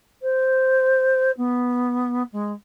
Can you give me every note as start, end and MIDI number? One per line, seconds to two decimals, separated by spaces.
0.22 1.31 72
1.37 2.23 59
2.32 2.52 56